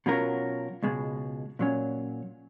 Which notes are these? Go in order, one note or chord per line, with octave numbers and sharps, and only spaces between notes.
B2 F#3 C#4 F4 A#4
C#2 B2 G#3
A#2 F#3 C#4